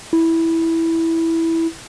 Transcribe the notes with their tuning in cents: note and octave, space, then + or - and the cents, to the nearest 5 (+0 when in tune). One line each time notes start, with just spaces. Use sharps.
E4 -5